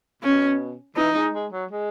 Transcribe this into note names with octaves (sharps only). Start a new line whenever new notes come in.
B2 C#4
E3 D#4
G#3
G#3
F#3
G#3